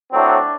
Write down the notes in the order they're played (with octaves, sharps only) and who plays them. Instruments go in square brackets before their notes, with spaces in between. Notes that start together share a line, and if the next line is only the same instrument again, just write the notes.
[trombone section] A2 F#3 A3 C4 D4